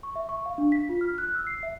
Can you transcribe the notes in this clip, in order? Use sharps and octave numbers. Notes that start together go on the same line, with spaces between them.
C#6
E5
C#6
F5
D4
B6
F4
F6
F#6
E6
C7
E5